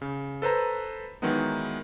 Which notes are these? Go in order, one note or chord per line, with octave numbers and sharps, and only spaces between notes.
C#3
A4 B4 C5 A#5
D#3 E3 F#3 G#3 B3 D#4